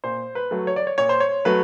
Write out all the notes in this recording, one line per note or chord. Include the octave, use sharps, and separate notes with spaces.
A#2 C5
B4
F#3 A3
C#5
D5
C#5
A#2 C#5
C5
C#5
F#3 A3 B4